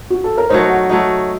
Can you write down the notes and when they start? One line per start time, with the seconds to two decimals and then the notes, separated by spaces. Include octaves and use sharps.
0.10 F#4
0.24 A4
0.38 A#4
0.49 F#3 A3 D#4 C5
0.70 F#5
0.89 F#3 A3 D#4